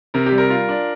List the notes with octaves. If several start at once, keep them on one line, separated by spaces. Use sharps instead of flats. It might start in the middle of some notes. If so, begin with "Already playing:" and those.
C3 A#4
G4
G3
A#4
F4
D4